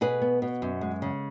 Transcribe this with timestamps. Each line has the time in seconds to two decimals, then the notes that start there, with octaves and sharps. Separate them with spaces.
0.01 B2 G#4 B4
0.22 B3
0.42 B2
0.62 F#2
0.81 G#3
1.02 C#3